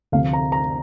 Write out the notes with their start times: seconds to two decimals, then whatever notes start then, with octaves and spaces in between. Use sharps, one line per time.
0.12 D2 C3 F3 F5
0.33 A#5
0.52 A#5